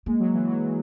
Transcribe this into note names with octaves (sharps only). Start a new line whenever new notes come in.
G#3 A#3
F#3
E3
F#3